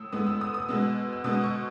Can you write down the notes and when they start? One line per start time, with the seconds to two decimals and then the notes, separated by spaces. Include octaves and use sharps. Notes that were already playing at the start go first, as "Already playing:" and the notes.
Already playing: A2 D#6 E6
0.13 A2 G#3 B3 D#6
0.27 E6
0.41 D#6
0.54 D#6
0.68 B2 G#3 B3 E6
1.13 E6
1.24 B2 G#3 B3 D#6
1.44 C#6